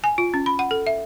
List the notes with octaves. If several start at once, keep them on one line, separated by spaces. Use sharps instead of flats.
G#5
F4
C#4
B5
F#5
A4
E5